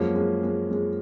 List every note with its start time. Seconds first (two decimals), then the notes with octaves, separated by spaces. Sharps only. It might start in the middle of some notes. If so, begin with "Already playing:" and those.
Already playing: F#2 F3 G#3 A#3 C#4
0.15 G#3
0.43 G#3
0.71 G#3